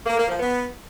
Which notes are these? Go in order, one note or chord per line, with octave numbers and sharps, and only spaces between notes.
A#3
A#3
F3
B3